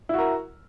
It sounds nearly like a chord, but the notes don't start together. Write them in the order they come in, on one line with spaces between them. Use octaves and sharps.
E4 F#4 A#4